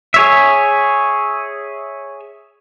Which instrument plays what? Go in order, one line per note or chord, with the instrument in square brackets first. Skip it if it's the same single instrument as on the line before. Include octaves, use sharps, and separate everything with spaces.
[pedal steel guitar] G#4 C#5 E5